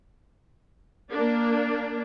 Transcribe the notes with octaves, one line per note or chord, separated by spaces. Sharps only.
A#3 D4